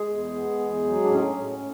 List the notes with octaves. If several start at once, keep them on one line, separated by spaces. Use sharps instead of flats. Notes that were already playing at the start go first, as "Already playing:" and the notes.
Already playing: G#3 G#4
E2
B3
E2
F#3
D4
A2 C#4
A2
A2